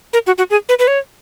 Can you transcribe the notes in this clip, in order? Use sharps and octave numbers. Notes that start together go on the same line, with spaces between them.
A#4
F#4
F#4
G#4
B4
B4
C#5